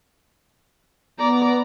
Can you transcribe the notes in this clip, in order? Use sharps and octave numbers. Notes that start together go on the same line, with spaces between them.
B3 D5 A#5